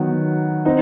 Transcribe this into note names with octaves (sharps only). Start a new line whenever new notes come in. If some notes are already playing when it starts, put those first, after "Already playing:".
Already playing: D#3 F#3 B3
C4 D#4